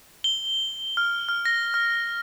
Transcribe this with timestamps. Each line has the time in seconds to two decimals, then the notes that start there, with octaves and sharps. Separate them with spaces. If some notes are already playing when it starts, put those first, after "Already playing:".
0.24 G7
0.97 F6
1.29 F6
1.45 A#6
1.74 F6